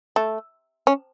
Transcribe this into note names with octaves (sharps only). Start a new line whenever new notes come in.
A3
C#4